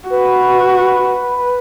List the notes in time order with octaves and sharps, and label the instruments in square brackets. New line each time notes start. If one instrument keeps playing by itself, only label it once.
[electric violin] F#4 [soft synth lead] B4